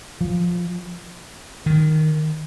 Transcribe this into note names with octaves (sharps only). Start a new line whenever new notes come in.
F3
D#3